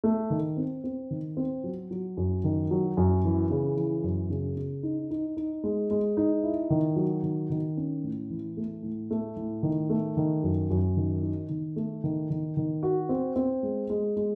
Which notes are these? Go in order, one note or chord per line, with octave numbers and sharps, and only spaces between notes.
A3
D#3
C4
C4
D#3
C4
F#3
F#3
F#2
D#3
F#3
F#2
E3
C#3
E3
F#2
C#3
C#3
D#4
D#4
D#4
G#3
G#3
D#4
E4
D#3
F#3
D#3
D#3
C#4
A2
E3
A3
A2
A3
A2
D#3
A3
D#3
F#2
F#2
D#3
D#4
D#3
A3
D#3
D#3
D#3
F#4
C4
C4
G#3
G#3
G#3